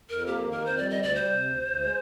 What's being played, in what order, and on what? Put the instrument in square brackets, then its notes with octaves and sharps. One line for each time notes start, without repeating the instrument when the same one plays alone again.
[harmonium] F2 [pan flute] A#4
[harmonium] A#3 [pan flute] G4
[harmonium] D#3
[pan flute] A#4
[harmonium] F2 [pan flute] C5
[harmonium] G3 [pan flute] D5
[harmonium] D2 [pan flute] D#5
[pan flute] D5
[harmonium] G3 [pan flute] C5
[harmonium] C3
D2
D2
G#3